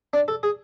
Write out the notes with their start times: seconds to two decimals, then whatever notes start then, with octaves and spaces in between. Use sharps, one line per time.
0.13 D4
0.28 A4
0.43 G#4